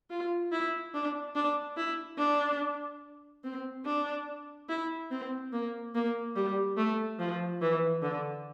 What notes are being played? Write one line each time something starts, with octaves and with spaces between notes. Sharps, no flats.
F4
E4
D4
D4
E4
D4
C4
D4
E4
C4
A#3
A#3
G3
A3
F3
E3
D3